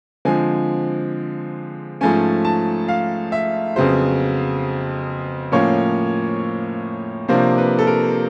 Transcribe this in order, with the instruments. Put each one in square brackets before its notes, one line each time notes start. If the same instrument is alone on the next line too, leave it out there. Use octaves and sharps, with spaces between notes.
[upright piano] D3 F3 G#3 C4 G#5
G#2 F3 A3 C#4 G#5
A5
F5
E5
F2 C#3 F#3 B3 C5
A2 F3 A#3 C#4 C#5
C3 F3 A#3 D4 C5
B4
A4
A#4